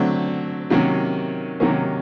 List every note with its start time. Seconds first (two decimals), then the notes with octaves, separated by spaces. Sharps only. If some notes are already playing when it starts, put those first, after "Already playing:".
Already playing: D3 F#3 A3 C4
0.70 C3 D#3 F#3 A#3 C#4
1.60 C3 D#3 F#3 A#3 C#4